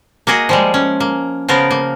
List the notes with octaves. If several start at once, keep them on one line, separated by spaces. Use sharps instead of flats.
A#3 F#4 G#4 D#5
F3 G3 G#3
C#4
A#3
C#3 F3 B3 A#4
A#3